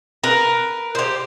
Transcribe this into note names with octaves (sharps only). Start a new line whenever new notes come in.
A#4 B4
G4 C5